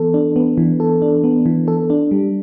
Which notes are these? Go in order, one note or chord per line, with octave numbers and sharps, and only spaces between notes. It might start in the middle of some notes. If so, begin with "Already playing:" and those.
Already playing: E3 B3 A4
D4
B3
E3
A4
D4
B3
E3
A4
D4
G3